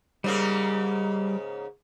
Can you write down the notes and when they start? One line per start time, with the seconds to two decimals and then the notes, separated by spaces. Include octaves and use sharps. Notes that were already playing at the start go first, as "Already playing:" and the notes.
0.24 G#2 C#3 G3 A#3